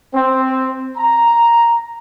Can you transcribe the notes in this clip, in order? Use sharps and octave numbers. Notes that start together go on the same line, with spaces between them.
C4
A#5